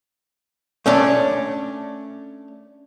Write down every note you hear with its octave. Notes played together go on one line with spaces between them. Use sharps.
A3 C#4 D4